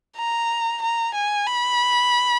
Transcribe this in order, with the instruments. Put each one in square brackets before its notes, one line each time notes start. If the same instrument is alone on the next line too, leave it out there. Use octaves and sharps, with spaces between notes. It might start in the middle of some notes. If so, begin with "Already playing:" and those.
[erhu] A#5
A#5
G#5
B5